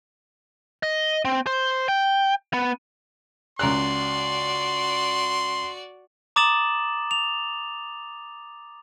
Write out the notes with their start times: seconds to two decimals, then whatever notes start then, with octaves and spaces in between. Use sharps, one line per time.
0.83 D#5
1.25 C4
1.47 C5
1.88 G5
2.53 B3
3.59 C#2 F#4 D5 A#5 C6 F#6
6.36 A#5 D6 D#6 A6 E7 F#7
7.11 F7